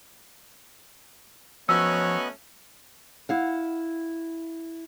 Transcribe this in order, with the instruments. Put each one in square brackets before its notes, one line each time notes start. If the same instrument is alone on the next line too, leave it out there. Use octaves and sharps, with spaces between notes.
[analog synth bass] F3 [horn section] F#3 A3 C#4 [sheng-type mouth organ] B3 D#5 F#6 [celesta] E6
[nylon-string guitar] E4 F5 F#5